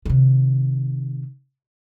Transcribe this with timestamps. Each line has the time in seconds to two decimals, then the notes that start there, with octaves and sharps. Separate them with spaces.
0.05 C3 D#3